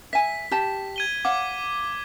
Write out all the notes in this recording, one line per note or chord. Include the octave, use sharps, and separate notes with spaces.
E5 G#5 B6
G4 A5
G#6 D#7 G7
C#5 F5 F#5 D6